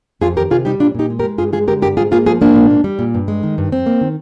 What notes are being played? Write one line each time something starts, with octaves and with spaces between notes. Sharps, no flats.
F2 F4 G#4
D#3 G4 A#4
C3 F4 G#4
G3 D#4 G4
A#2 D4 F4
A#2 D#4 G4
G#3
G4 A#4
G#3
G2 F4 G#4
G#3 F4 G#4
D3 G4 A#4
G2 G4 A#4
G#2 F4 G#4
A#3 F4 G#4
F3 F4 G#4
G#2 A#3 D4
A#2
A#3
G3
A#2
G2
G#3
D#3
G2
F2 C4
A#3
D#3